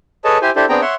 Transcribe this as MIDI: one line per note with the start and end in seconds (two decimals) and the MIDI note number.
0.24 0.38 68
0.24 0.38 69
0.24 0.38 71
0.24 0.38 73
0.24 0.38 75
0.24 0.38 81
0.42 0.50 64
0.42 0.50 67
0.42 0.50 72
0.42 0.50 80
0.56 0.65 62
0.56 0.65 64
0.56 0.65 67
0.56 0.65 69
0.56 0.65 72
0.69 0.81 59
0.69 0.81 60
0.69 0.81 62
0.69 0.81 68
0.69 0.81 79
0.69 0.81 82
0.82 0.95 73
0.82 0.95 76
0.82 0.95 78
0.82 0.95 84